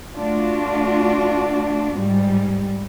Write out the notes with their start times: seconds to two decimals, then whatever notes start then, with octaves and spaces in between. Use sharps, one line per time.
0.18 A3 D4 F4 F#4
1.96 G#2 G3